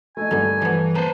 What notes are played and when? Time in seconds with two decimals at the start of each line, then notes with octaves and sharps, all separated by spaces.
0.17 A3 D#4 G#5
0.31 G2 D3 D#3 A3
0.62 E3 F3 B3
0.95 A#3 B4 C5 A5 A#5